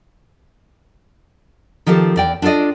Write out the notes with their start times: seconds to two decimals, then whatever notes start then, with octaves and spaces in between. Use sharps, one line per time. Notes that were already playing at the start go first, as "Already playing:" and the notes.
1.86 D#3 F3 C4 G4 A4
2.16 E2 D5 G5
2.42 D4 F4 A4 D5 D#5